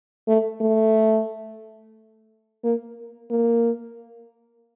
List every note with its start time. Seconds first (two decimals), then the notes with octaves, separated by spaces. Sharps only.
0.28 A3
0.61 A3
2.64 A#3
3.31 A#3